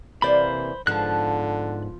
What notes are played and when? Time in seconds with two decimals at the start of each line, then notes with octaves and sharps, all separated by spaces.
0.22 C3 E3 A#3 C5 D5 B5
0.87 G#2 D3 F3 B3 A5 F#6